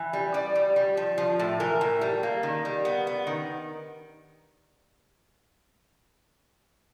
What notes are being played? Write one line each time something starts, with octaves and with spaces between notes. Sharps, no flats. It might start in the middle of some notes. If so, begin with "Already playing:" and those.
Already playing: E3
G3
G3 D5
G3
G3
F3
F3
A2
E3 A#4
A2
G3
A#3
D#3
G3
B3
B3
D#3